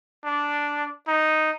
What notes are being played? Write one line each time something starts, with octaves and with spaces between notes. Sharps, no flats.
D4
D#4